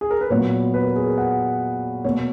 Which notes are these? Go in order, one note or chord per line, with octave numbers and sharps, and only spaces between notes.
G#4
A#4
B4
A#2 F#3 B3 C#5
B4
A#4
G#4
A#4
F#5
B2 A#3 C#5